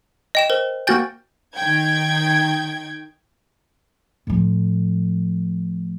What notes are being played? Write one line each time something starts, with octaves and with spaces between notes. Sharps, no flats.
D#5 G5 E7
A#4 C5
A#3 F#4 G5 G#5 G6 A6
D#3 G5 G#6
A2 F3